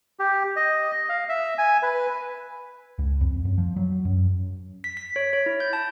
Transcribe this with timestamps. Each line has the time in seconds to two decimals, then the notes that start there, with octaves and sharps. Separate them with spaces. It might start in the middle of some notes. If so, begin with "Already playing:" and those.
0.19 G4
0.56 D#5
1.09 F5
1.29 E5
1.58 G#5
1.83 B4
2.99 C#2
3.21 F2
3.45 F#2
3.58 F3
3.76 F#3
4.05 F#2
4.84 B6
4.97 B6
5.16 C#5
5.33 C#5
5.46 E4
5.60 G6
5.73 A5